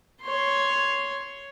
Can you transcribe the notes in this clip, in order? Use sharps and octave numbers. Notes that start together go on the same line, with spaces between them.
C#5 C6